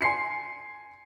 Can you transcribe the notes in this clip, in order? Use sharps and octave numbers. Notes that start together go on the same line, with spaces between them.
G#5 C6 C7 C#7